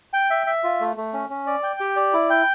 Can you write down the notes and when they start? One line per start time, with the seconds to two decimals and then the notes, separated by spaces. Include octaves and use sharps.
0.13 G5
0.31 E5
0.47 E5
0.64 F4
0.81 A3
0.97 A3
1.13 C#4
1.30 C#4
1.47 D5
1.63 G5
1.80 G4
1.96 D5
2.13 E4
2.30 G5